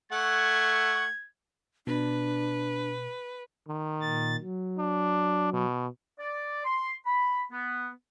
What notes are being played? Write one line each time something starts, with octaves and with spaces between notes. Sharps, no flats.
A3 F#5 C#6 G#6
B2 D4 B4
D#3
A#2 A6
F#3
D4
B2
D5
C6
B5
B3